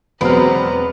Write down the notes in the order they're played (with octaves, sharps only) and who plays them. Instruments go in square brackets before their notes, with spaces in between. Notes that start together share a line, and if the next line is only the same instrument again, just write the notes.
[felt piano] E1 F#3 F6 [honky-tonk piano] B3 [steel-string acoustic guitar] C4 [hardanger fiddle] B4 A#5